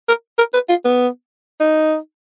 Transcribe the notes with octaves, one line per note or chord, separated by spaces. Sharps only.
A#4
A#4
B4
F4
B3
D#4